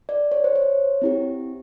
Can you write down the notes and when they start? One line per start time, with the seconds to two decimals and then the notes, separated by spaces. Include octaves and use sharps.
0.09 D5
0.32 C#5
0.44 C5
0.55 C#5
1.02 C4 E4 G4